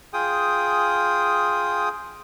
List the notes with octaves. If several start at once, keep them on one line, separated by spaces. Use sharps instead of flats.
F4 G#4 G5 D#6